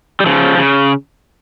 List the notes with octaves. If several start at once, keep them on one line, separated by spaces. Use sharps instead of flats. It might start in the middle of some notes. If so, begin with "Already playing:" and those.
G3
C#3 F3
C#3